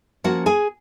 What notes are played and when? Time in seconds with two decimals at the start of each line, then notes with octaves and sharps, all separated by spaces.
0.24 F3 A#3 C#4 F#4 F#5
0.46 G#4 G#5